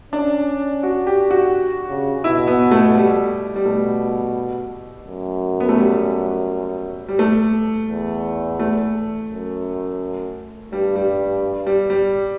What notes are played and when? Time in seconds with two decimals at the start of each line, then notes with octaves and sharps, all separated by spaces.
0.12 C#4 D4
0.83 F#4
1.07 G4
1.31 F#4
1.89 C#3
2.24 B2 E4
2.48 B3
2.71 A3
2.95 G3
3.56 G3
3.66 B2 A3
5.07 F#2
5.60 B3
5.69 A3
5.78 G3
7.08 G3
7.19 A3
7.89 E2
8.60 A3
9.31 F#2
10.72 G2 G3
10.96 G3
11.66 G3
11.90 G3